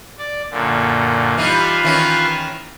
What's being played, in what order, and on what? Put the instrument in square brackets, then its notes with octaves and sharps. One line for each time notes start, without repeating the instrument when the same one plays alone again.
[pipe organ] D5
F#2 A#2 D3
[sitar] E3 G3 D#4 [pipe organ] F4 B4 F5
[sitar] D#3 E3 C#4